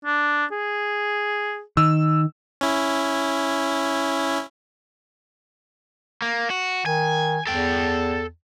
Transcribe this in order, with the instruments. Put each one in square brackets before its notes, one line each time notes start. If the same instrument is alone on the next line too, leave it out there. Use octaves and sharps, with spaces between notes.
[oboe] D4
G#4
[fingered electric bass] D#3 [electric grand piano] E6
[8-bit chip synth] C#4 E4
[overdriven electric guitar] A#3
F#4
[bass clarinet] D#3 [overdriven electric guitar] G#5
[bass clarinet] E2 [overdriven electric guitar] A4 G5